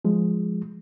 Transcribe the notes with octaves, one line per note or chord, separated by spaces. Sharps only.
F3 G#3